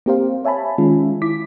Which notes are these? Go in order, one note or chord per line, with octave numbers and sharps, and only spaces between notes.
A#3 C4 G4 A#4 C5 F5
C#5 E5 G#5 A5 B5
D#3 G#3 C#4 F4
E4 D6 B6